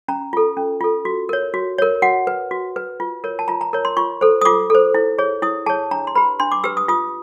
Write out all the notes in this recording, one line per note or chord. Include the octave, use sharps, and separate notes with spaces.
C#4 A#5
F4 A4
C#4
F4 A4
F#4
A#4 C#5
F#4
A#4 C#5
F#4 F#5
B4
F#4
B4
F4
A#4 C#5
A5
F4 A#5
A#5
A#4 C#5
C6
F4 C#6
A4 C5
D#6
F4 D6
A4 C5
E4
G#4 C#5
E4 D#6
G#4 C#5 A5
D4 A#5
C6
G4 B4 B5
D4 C6
D6
G4 B4 E6
D#6
F4 D#6